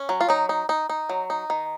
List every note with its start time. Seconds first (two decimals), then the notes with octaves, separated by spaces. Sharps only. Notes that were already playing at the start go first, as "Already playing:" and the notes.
Already playing: C#4
0.09 F#3
0.21 F4
0.29 F#3 D#4
0.49 D#4
0.69 D#4
0.90 D#4
1.09 F#3
1.30 D#4
1.50 D#3